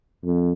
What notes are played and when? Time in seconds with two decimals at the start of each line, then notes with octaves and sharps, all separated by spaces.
0.25 F2